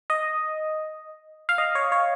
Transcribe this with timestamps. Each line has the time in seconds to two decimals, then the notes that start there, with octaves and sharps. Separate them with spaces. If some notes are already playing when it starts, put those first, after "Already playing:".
0.10 D#5
1.49 F5
1.58 D#5
1.75 C#5
1.92 C#5